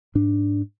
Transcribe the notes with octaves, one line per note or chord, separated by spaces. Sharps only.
G#2 D4